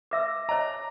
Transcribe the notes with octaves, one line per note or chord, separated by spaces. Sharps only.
B4 E5 D6 E6 A#6
C#5 D#5 A5 A#5